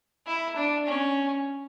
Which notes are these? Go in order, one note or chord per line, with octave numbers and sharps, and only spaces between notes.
E4
D4
C#4